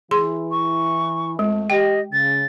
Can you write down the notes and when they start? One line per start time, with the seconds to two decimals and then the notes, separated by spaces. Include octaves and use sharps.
0.11 E3 E4 G#4 C6
0.51 C#6
1.39 F2 G#3 A3
1.70 G4 D#5 G5
2.12 C#3 A6